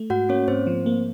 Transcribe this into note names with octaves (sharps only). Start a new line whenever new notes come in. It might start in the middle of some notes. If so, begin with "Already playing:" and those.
Already playing: A3
G#2 F#4 F#5
A#3 C#4 C#5
G#2 C4 C5
F3
A#3